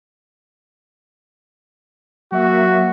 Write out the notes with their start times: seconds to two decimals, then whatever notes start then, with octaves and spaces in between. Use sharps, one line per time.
2.32 F#3 A#3 F#4 E5